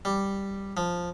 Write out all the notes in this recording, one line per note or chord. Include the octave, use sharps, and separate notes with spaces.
G3
F3